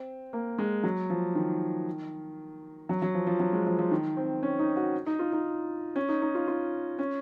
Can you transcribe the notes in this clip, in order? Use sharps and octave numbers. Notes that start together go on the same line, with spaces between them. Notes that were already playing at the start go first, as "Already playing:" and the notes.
Already playing: C4
A#3
G#3
F#3
F3
D#3
F#3
F#3
F3
F3
F#3
G#3
F3
F3
D#3
C4
C#4
D#4
F#4
D#4
F4
D#4
C#4
D#4
D#4
F4
F4
C#4